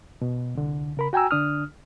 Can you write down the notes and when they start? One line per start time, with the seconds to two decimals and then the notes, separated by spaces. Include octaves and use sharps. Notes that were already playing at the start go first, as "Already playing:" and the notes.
0.22 B2
0.55 C2 D3
0.97 C#3 A#4 B5
1.13 F#4 G5 G#5 A#5 E6
1.31 D3 D4 D#6 F6